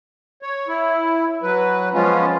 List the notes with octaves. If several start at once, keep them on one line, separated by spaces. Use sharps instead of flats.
C#5
E4
F#3 B4
F3 G#3 B3 C#4 F4